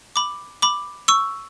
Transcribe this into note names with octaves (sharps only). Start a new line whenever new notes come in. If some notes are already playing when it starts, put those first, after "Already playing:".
B5 D6
B5 D6
C#6 E6